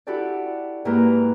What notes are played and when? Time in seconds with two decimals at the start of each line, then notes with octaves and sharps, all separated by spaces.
0.07 E4 F#4 G4 A4 D5
0.85 G#2 A#3 E4 G4 A#4 B4